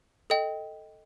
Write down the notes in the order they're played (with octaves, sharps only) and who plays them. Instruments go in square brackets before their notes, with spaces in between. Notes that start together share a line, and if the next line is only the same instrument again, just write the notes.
[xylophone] A4 D#5 G5